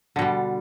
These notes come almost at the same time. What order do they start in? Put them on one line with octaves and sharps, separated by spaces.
D3 B2 G3